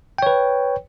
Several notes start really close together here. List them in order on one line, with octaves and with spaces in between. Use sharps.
G5 C#5 B4